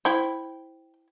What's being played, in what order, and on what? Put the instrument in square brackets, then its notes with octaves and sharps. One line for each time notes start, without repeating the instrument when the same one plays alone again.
[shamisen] E4 C5 [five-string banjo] G5